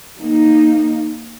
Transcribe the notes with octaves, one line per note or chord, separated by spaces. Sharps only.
A#3 D#4